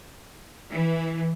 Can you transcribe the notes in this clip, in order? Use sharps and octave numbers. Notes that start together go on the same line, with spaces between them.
E3